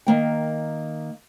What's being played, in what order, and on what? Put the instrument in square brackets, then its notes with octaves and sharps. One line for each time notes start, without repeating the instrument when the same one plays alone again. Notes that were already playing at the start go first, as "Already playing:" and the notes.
[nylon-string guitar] D#3 A#3 G5